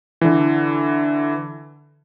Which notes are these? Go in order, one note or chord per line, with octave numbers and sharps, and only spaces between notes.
D3 E3